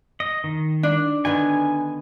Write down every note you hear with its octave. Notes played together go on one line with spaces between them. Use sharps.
D#5
D#3
D4
D3 D#3 B3 G#5